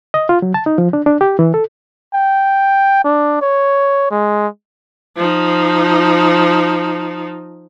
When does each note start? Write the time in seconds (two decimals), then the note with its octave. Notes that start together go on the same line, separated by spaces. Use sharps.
0.14 D#5
0.29 F4
0.42 F#3
0.54 A5
0.66 D#4
0.78 F3
0.93 D4
1.06 D4
1.21 G4
1.39 E3
1.54 A4
2.14 G5
3.04 D4
3.42 C#5
4.11 G#3
5.17 F3 D#4